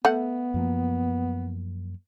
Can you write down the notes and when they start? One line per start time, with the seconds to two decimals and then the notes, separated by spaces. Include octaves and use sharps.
0.05 A3 B3 F#5
0.54 F#2 F3 A#3